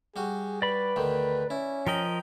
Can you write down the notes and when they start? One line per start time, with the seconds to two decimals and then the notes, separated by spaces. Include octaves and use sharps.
0.16 G3 F#4 G#4
0.62 B4 D5 B5
0.96 D2 D3 D#3
1.50 C#4 E4
1.87 F3 A#4 D#5 G5 B5